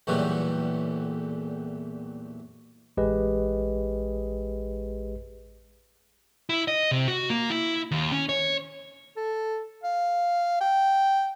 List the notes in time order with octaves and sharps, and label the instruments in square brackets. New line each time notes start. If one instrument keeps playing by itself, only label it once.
[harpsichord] B1 E2 A#2 E3 F#3 G3
[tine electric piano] A1 G#3 G4 G#4 B4 D#5
[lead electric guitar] E4
D#5
C3
F#4
A#3
E4
D#2
C#4
C#5
[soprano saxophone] A4
F5
G5